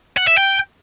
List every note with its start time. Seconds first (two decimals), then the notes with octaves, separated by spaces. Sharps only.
0.17 F#5
0.27 E5
0.37 G5